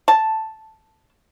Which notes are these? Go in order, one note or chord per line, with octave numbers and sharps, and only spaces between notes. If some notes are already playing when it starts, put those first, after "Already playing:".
A5